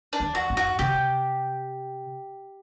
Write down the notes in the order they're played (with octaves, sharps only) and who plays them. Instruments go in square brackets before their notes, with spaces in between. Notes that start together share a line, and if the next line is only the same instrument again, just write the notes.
[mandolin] D4
[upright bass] E2
[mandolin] F#4
[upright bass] F#2
[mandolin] F#4
[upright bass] C3 [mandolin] G4